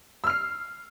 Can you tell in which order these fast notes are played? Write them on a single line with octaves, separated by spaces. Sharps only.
E6 F6 C7